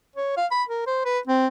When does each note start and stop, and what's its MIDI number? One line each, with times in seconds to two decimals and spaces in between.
0.16 0.36 73
0.37 0.46 77
0.51 0.63 83
0.69 0.84 70
0.87 1.01 72
1.05 1.19 71
1.27 1.47 60